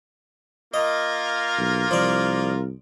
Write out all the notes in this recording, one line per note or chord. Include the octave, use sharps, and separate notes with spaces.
A#3 F4 A#4 D#5
B1
C2 F3 D5